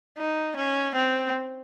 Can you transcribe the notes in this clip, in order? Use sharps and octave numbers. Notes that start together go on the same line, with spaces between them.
D#4
C#4
C4